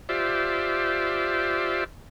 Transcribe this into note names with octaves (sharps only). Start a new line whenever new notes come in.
F4 G4 C5 D5 E5